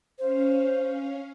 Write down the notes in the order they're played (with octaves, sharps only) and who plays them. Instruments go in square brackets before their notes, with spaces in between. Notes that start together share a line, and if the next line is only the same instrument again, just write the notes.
[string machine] C#4 F5 [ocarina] C5